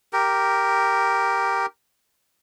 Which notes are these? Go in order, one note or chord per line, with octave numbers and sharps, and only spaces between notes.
G4 A#4